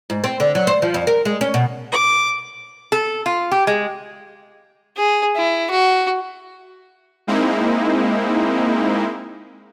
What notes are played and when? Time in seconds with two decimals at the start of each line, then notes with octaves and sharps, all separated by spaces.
0.10 G#2
0.24 C4
0.40 D3
0.55 F#3
0.67 C5
0.82 F3
0.94 F2
1.07 A#4
1.25 G#3
1.41 C#4
1.54 B2
1.92 D6
2.92 A4
3.26 F4
3.51 G4
3.67 G#3
4.96 G#4
5.35 E4
5.70 F#4
7.27 G#3 A#3 C4 D#4 E4